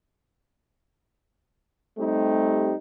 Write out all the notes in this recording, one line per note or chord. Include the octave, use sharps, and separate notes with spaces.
G3 A3 C4 D#4 G4